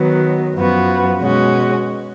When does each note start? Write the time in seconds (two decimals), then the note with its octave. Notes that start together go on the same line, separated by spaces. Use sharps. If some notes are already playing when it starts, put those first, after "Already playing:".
Already playing: D#3 F#3 B3
0.53 F#2 F3 B3 F#4
1.19 B2 G#3 C#4 F#4